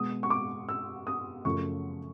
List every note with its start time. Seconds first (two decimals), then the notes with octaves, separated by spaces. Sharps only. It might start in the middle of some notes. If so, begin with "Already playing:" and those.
Already playing: B2 G#3 D#6
0.23 C#6
0.30 D6
0.69 E6
1.07 D#6
1.45 F#2 C#3 F3 A3 C#6